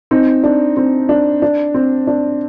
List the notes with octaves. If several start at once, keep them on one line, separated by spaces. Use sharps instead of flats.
C4 D#4
D4
C4
D4
D4
C4
D4